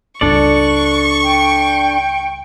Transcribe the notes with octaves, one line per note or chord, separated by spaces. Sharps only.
C#2 G2 D4 A4 D5 C#6
G5